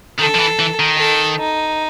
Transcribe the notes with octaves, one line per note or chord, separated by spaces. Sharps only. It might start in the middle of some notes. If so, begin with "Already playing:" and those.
D#3 A4
F3
E3
E3
D#3
A4
D#4